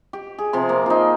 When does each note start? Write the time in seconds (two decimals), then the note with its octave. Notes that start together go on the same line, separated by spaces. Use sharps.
0.13 G4
0.38 G#4
0.53 C3 F3 C6
0.69 A#3
0.86 D#4 F4